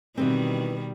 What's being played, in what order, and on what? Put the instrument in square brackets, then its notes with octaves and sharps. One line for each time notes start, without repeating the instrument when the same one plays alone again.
[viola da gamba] B2 D#3 G3 [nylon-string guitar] E3 B3 C4